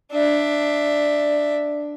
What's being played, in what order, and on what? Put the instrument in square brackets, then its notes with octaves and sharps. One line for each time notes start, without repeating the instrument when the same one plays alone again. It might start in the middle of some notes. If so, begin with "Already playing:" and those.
[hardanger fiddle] D4 E5